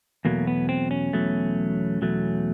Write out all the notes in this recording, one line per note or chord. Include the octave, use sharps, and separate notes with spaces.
E2 B2 F#3 A3 A#3
B3
C4
C#4
E2 B2 F#3 A3
E2 B2 F#3 A3